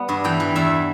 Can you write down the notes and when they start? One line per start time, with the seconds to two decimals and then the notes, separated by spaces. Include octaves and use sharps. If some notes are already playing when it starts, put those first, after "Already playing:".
Already playing: G3 B3
0.09 G2
0.24 E3 G5
0.40 E3
0.56 E2 E5